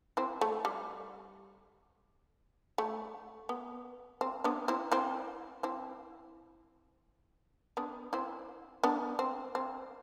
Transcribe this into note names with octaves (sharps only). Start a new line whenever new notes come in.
C4 E4
A3
G3
A3
B3
C4
B3 D4
C4 E4
C4 E4
C4 E4
B3 D4
C4 E4
B3 D4
C4
C4